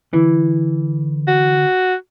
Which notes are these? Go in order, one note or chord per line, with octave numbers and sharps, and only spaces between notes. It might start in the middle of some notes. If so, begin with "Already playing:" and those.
D3 E3
F#4